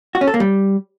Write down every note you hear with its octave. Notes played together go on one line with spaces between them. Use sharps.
F#4
C#4
A4
A#3
G3